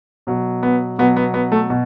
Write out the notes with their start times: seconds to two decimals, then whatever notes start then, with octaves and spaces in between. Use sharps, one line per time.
0.27 B2 F#3
0.63 B3
0.98 B2 F#3 B3
1.16 B3
1.34 B3
1.52 A3
1.70 B2